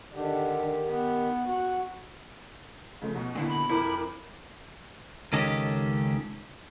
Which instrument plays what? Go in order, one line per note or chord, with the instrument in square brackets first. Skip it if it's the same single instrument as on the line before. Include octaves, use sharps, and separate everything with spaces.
[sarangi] D3 [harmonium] D#3 G4
[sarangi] B3
F#4
[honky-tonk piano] C#3 F3 A3
B2
[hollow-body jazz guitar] A#2 D3 E4
[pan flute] B5
[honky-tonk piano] F2 A#4 D6 [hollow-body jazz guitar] E4
[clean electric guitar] C#2 D#3 C#4 G4 A4 D#5